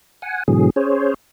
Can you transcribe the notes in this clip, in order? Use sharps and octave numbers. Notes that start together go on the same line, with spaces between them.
F#5 G#5
G#2 B2 D3 E3 F#3 G#4
C#4 G#4 C5 C#5